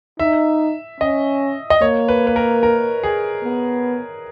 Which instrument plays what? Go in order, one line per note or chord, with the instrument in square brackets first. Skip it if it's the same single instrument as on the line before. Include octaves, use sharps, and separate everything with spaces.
[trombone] D#4 [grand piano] E5
[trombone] C#4 [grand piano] D#5
[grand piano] D#5
[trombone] A#3 [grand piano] C#5
[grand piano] B4
B4
A#4
A#4
G#4
[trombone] B3